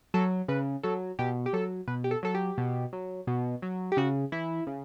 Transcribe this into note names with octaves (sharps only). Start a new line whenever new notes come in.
F#3 A4
C#3 B4
F#3 A4
B2 G4
G4
F#3 A4
B2 B4
G4
A4
F#3 A4
G4
B2
F#3
B2
F#3
G4
C#3 F#4
E3 E4
C#3